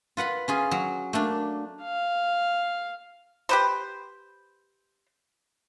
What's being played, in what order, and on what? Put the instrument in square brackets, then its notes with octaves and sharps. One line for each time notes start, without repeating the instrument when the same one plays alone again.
[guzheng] F4 B4 F#5 B5
C#4 F4 G#4
F#3
A3 A#3 D4
[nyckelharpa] F5
[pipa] G4 B4 C5